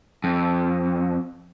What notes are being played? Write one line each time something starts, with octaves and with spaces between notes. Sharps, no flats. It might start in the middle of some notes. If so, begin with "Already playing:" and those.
F2